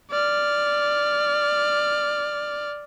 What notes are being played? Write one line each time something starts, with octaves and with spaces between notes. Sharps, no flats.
D5 F6